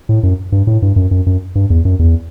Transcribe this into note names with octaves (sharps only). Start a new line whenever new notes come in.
A2
F#2
G2
A2
G2
F#2
F#2
F#2
G2
E2
F#2
E2